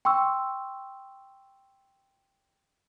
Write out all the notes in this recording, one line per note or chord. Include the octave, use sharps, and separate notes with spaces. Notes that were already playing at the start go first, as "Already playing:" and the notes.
G5 C6 C#6 E6